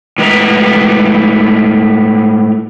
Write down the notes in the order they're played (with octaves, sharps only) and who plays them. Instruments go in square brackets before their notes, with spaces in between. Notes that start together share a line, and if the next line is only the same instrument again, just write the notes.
[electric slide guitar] A2 G#3 B3 B4 E5 A#5